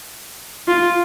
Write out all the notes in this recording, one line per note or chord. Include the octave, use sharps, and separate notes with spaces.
F4